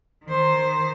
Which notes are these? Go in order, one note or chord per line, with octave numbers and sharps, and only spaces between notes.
D#3 C5